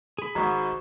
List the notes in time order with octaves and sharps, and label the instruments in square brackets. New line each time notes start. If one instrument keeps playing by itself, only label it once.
[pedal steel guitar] G#4 B5
[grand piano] G#1 G#2 [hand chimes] F#4 D#5 C#6 [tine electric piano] A#5